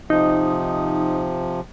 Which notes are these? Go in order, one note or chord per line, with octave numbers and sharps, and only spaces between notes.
C3 F3 D#4